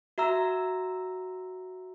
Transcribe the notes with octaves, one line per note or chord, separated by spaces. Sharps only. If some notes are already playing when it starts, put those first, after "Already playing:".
F#4 E5 A#5 E6